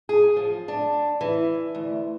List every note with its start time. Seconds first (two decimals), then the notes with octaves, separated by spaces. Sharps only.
0.09 G#4
0.37 F3
0.68 D4
1.21 E3
1.75 D2